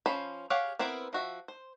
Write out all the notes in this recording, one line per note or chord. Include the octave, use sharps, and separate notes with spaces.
F3 C#4 C5 B5
G4 G#4 C#5 F5 F#5
B3 C4 E4 A#4 C5
F3 F#4 E5
C5